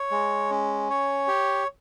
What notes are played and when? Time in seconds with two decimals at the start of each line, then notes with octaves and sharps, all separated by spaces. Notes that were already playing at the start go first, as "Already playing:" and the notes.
Already playing: C#5
0.11 G#3
0.50 C#4
0.90 C#5
1.28 G4